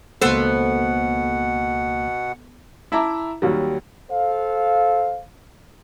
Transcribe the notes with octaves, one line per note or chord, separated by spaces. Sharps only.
C#2 B2 A#3 B3 A4 C5 F#5
E4 E5 A5 A#5 D6
D#2 F#3 G3
A4 C5 F5